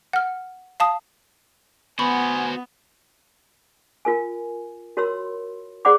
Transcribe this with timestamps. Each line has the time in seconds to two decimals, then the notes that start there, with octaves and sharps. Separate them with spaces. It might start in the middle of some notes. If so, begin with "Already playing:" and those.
0.13 F#5 F6
0.80 F5 A5 D#6
1.99 B3 F#4 C5 G#5 B5 C#6
4.05 F4 A#4 G#5
4.97 F#4 A#4 C#5 B5 C6 E6
5.85 G#4 C5 D5 F#5 B5 D6